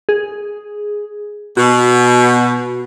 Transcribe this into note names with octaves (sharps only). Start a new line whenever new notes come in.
G#4
B2 F#4